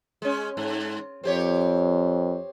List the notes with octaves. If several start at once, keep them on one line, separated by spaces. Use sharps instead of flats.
G#3 C#4
G#2
F2 C4 G4 C#5